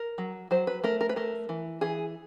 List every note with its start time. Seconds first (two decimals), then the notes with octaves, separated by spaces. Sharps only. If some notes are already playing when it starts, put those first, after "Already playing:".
Already playing: A#4
0.18 F#3
0.51 F#3 C5
0.67 B4
0.84 A3 A#4
1.01 A#4
1.09 B4
1.16 A3 A#4
1.49 E3
1.81 E3 G#4